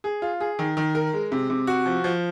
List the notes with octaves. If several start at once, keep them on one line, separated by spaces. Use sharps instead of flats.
G#4
F4
G#4
D#3
D#3
A#4
G#3
C3
C3
F#4
F3
F3